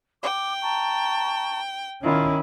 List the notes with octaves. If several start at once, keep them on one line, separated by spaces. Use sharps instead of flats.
G5 D6
A5 A#5 C#6
D#3 C#4 E4 F4